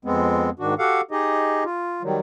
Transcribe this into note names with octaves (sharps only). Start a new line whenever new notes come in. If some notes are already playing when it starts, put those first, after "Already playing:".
F2 G#3 B3 C4
G#2 D#3 D4 F#4
F#4 G4 A4 F5 F#5
D#4 G4 G#4 D#5
F4
D#3 F#3 G3